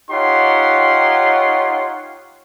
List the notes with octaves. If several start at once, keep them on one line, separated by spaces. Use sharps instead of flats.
D#4 F4 G4 C#5 F#5 C6